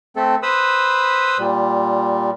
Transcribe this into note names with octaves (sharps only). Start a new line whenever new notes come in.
A3 C4 A4
B4 C5 B5 D#6 E6
A#2 G3